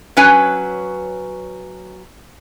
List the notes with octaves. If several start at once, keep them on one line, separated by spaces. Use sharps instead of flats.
F#3 C#4 B4 G#5